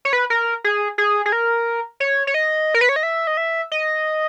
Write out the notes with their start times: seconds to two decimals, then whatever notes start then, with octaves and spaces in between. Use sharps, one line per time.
0.05 C#5
0.13 B4
0.30 A#4
0.64 G#4
0.98 G#4
1.26 G#4
1.32 A#4
2.00 C#5
2.27 C#5
2.34 D#5
2.74 A#4
2.81 B4
2.89 C#5
2.96 D#5
3.03 E5
3.27 D#5
3.37 E5
3.72 D#5